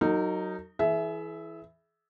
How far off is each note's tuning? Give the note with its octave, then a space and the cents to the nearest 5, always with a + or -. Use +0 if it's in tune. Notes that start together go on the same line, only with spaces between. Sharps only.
F#3 +10 D#4 +0 A#4 -40
E3 +0 G#4 +40 E5 +0